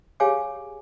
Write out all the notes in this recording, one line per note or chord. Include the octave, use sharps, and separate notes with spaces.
G4 G#4 C#5 F5 G#5 D6